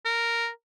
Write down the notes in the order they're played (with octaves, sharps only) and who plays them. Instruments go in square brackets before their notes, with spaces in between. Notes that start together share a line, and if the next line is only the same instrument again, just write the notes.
[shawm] A#4